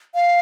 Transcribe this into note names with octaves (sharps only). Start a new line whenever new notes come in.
F5